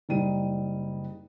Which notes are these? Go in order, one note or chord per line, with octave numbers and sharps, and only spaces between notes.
F#1 G3 D#4 D#7